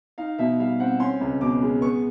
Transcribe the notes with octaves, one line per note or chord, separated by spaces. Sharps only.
D#4 F5
B2 E5
G3 F5
C4 F#5
C#4 C6
C#2
B2 D6
G#3
B3 C#6